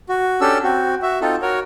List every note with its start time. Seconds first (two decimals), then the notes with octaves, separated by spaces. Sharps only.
0.09 F#4
0.41 C#4 D4 G4 A4 E6
0.64 C4 F#4
1.02 F#4 E5
1.21 C4 D#4 F4 A4
1.42 F#4 A#4 C#5